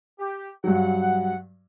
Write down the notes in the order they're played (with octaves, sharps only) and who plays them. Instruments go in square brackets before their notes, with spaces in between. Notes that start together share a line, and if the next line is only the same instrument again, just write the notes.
[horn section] G4
[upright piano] G2 F#3 [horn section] F#5